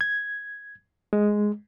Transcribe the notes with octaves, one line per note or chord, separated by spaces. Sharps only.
G#6
G#3